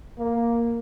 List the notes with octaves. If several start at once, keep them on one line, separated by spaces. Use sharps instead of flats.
A#3